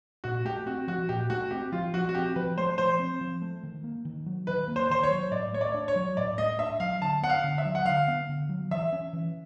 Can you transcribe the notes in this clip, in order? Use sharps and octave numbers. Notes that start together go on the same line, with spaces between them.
A#2 F#4
A3 G4
C4 F#4
F3 F#4
A#2 G4
A3 F#4
C4 G4
F3 F4
F3 F#4
F#4
C4 G4
F3 B4
A3 C5
F3 C5
C4
F3
A3
D#3
A#3
D#3
F#3
D#3 B4
A#3
C5
D#3 C5
C#5
F#3
A2 D5
A3 C#5
D5
D4
C#5
F#3
A2 D5
A3 D#5
D4 E5
F#3 F5
D3 A5
B3 F#5
F5
D3
E5
F#3
F#5
D3 F5
B3
D3
F#3
E3 E5
C#4
E3